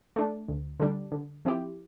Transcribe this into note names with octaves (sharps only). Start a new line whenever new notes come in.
A3 D4
D2
D3 G3 D4
D3
F3 C4 E4 G4